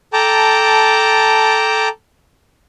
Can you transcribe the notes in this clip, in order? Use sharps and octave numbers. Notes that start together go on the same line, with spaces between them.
A4 G5 A5 A#5 D6